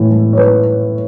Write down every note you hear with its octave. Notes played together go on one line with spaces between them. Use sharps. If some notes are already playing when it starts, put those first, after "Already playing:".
Already playing: A2 E3
E3
C#5
E3 B4